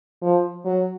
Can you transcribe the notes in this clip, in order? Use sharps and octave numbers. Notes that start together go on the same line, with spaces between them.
F3
F#3